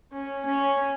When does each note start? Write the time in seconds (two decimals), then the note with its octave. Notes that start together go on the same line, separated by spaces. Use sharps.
0.12 C#4
0.45 C#4